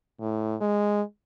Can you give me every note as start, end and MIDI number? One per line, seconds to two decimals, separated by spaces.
0.20 0.55 45
0.61 1.02 56